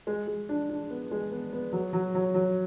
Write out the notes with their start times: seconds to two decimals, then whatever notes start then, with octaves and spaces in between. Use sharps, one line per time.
0.07 G#3
0.27 G#3
0.49 D4
0.69 D4
0.90 B3
1.11 G#3
1.32 B3
1.52 B3
1.73 F#3
1.93 F#3
2.15 F#3
2.34 F#3